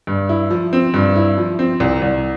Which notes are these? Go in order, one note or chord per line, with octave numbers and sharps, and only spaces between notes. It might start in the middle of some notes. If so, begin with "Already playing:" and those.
G2
E4
F3
C4
G2
E4
F3
C4
C2
C2